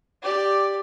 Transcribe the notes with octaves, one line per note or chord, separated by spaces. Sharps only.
G4 D5